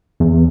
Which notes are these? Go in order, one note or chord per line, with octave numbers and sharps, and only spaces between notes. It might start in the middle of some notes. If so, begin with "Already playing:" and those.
E2